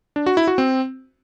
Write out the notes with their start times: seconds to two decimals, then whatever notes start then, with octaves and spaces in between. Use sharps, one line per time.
0.16 D4
0.26 F#4
0.37 E4
0.47 F#4
0.58 C4